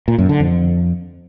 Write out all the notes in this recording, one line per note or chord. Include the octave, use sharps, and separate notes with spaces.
A#2
F#2
D3
F2